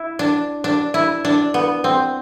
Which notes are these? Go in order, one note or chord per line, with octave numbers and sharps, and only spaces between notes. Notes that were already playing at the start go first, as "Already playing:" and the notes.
Already playing: E4
D4
D4
E4
D4
B3
C4